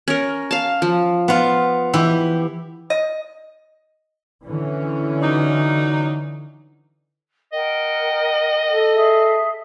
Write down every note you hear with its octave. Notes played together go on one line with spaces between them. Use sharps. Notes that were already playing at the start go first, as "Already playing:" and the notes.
C#4 A#4
F5 A5
F3
B3 F4
E3 E4 G4
D#5
D3 E3 C#4
F#3 D4 D#4
A#4 D#5 F#5 G5
A4
G#4 E5